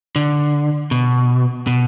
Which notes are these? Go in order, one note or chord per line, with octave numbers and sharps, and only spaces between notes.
D3
B2
B2